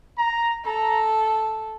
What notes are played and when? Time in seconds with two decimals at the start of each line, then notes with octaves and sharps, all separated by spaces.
0.18 A#5
0.64 A4 A#5